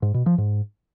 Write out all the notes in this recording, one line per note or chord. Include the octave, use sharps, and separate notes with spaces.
G#2
B2
F3
G#2